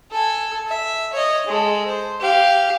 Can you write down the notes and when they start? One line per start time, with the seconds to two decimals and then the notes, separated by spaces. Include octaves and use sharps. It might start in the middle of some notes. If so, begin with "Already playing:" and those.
0.11 A4 G#5
0.67 E5
1.13 C#5 D#5
1.46 G#3 A4
1.86 C5
2.21 G4 F5